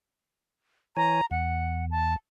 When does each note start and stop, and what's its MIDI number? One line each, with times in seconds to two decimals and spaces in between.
0.97 1.21 52
0.97 1.21 73
0.97 1.21 80
0.97 1.26 82
1.31 2.16 40
1.31 1.85 78
1.91 2.14 81